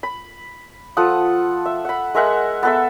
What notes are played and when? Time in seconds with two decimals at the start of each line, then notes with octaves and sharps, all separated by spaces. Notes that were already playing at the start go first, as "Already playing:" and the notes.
0.03 B5
0.97 F3 A4 F#5 D#6
1.65 E5
1.85 F#5 B5
2.15 G#3 A#4 E5 F#5
2.63 B3 A4 E5